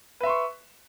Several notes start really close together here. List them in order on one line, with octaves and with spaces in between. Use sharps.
B4 E5 C6 C#6